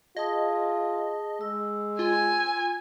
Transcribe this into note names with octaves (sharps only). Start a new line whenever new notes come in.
F4 G#4 D#5 A5 D#6
G#3 E6
F4 G#5